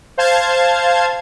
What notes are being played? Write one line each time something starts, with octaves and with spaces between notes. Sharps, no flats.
C5 F5 A5 G#6